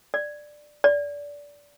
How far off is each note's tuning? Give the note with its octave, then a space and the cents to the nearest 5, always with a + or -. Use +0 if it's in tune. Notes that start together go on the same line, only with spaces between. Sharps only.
D5 +10
D5 -20